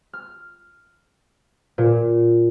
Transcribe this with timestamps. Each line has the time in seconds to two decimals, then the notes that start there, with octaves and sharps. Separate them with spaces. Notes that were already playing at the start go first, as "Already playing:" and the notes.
0.13 F6
1.78 A#2